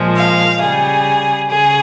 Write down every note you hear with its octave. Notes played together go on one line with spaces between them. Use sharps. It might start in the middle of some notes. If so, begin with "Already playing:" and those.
Already playing: A#2 F3 G#3
F5
C#3 G3 G#4
C#3 G#4